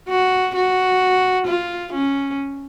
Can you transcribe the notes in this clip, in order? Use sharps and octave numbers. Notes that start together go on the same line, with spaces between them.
F#4
F#4
F4
C#4